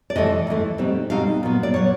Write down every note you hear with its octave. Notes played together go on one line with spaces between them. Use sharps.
D5
F2 C3 E3 A3 D#5
F2 C3 E3 A3
B2 G3 C4 D#4
B2 G3 C4 D#4 F5
A#2 F#3 B3
D5
A#2 F#3 B3 C#5